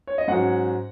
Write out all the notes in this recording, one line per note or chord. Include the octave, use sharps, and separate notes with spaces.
C#5
D#5
G#2 F#3 C#4 F#5